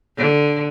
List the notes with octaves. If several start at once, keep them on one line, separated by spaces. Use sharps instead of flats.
D3